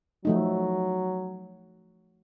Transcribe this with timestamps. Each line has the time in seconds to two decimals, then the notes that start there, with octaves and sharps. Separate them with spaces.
0.25 F3 F#3 A3 D#4